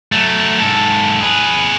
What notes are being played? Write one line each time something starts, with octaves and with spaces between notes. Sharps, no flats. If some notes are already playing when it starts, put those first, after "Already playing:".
F#3 A3
G#2 A4
G#4 B4